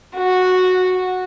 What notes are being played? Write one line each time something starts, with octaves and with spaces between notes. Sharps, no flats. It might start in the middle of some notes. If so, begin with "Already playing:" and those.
F#4